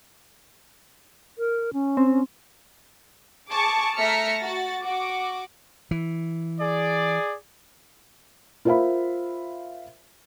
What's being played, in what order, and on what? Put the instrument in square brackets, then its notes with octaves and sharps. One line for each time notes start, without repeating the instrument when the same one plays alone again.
[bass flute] A#4
C#4
[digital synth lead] C4
[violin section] G#4 A5 C#6 D6
A3 E5 A#5 F6 B6 C#7
F#4 A6
F#4 D6
[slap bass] E3
[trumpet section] G#4 D5
[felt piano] F4 A#4 C5 E5 F5 B5